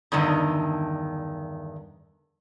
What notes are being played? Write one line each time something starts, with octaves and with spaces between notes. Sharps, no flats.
E2 G2 D3 D#3